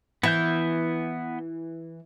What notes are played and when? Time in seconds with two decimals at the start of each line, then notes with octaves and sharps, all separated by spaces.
0.23 E3 B3 E5 G6